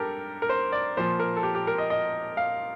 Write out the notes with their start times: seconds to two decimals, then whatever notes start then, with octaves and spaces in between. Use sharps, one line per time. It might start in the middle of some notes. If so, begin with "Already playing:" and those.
Already playing: G2 G4 A4 A#4
0.42 A#4
0.49 C5
0.72 D5
0.97 A#2 F3 C5
1.20 A#4
1.36 A4
1.43 G4
1.55 G4
1.67 A#4
1.78 D#5
1.90 D#5
2.37 F5